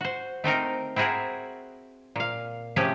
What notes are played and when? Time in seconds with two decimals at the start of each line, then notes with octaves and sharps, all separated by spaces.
0.01 F#4 C5
0.44 A3 C4 D#4 A#4
0.96 C4 E4 F#4 G#4 A#4
2.16 A#2 F5
2.76 C3 F3 A3 C#4 G4 G#4